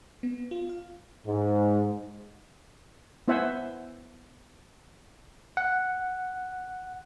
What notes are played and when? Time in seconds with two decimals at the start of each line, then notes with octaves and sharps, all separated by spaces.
0.23 B3
0.51 F4
0.69 F5
1.26 G#2
3.28 B3 E4 C5 E5 F#5 G#5
5.57 F#5